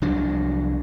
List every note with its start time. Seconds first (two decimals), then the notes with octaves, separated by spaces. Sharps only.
0.02 C2 F3 F#3 D4